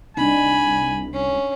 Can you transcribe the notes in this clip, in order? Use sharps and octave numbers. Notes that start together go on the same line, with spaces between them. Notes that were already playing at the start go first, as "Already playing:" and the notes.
C2 D4 D#4 G#5 B5
C#4